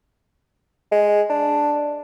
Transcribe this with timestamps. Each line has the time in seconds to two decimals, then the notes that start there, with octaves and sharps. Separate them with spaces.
0.92 G#3
1.30 D4